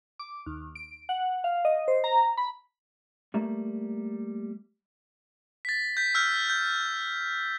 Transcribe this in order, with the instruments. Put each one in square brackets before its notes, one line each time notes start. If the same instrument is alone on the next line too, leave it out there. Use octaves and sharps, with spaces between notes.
[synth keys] D6
D#2
D7
F#5
F5
D#5
C5
A#5
B5
[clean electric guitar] G3 A3 A#3
[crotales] A6 B6
G6 B6
E6 F6 G6
G6